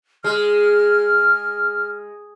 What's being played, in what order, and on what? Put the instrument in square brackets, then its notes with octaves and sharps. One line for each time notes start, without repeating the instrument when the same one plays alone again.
[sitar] G#3 [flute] F6